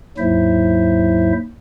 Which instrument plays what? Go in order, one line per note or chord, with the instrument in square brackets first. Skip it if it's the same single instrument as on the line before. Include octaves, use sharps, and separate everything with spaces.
[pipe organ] D#2 G#2 F#3 E4 C5 E5